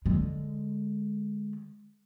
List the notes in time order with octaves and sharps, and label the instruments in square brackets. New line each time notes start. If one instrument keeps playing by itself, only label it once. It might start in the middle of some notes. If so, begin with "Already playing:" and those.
[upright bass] D3 G#3